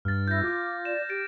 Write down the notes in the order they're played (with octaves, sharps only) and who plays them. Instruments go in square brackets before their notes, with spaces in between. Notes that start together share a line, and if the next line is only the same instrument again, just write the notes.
[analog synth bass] G2 [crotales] F6 A6
[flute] E4 [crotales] G6 A#6
[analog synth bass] F4 [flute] D6
[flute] D5 [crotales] E7
[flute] G4 [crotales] A6 D7